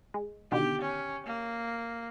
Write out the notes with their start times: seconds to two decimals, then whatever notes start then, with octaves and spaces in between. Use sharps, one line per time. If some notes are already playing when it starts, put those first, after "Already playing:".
0.14 G#3
0.52 B2 D3 D#3 G4
0.82 C#4
1.27 A#3